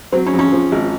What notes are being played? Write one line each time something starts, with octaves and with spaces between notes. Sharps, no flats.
F#3 C4
C#4
F2
C#4
F3
G#1